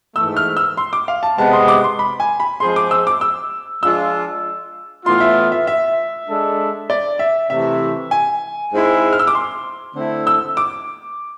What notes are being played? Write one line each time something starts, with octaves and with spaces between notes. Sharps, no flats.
G#2 E3 A3 E6
F6
E6
C6
D6
F5
A5
C3 G#3 B3 A5
C6
D6
C6
B5
G#5
B5
F3 G#3 C4 G#4 C5 C6
D6
E6
D6
E6
F3 G#3 D4 F4 E6
A2 E3 B3 F4 C6
E5
E5
E5
G#3 D4 A4
D5
E5
C3 E3 A3 E5
G#5
G#2 G#3 C4 E4
F6
E6
D6
C6
D3 A3 C4 E4 A4
E6
D6